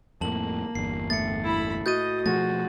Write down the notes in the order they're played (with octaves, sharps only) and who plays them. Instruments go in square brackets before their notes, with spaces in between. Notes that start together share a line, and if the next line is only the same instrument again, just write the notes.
[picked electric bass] F2 A2 [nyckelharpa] A#3 [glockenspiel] A5 F#7
[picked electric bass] G1 E2 [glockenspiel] C7
[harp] A2 [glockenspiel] A6 C#7
[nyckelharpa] E4 B5
[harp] F#4 B4 [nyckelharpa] D#5 D#6 [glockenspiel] G6 A6 D#7
[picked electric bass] B2 F3 A3 [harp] F4 G#4 [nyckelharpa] F#4 [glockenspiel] A6